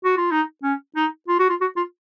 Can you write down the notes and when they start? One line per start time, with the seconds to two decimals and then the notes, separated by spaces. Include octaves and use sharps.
0.04 F#4
0.18 F4
0.31 D#4
0.63 C#4
0.96 D#4
1.28 F4
1.39 F#4
1.49 F4
1.61 F#4
1.77 F4